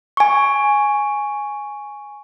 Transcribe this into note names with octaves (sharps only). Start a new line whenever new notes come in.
G#5 C#6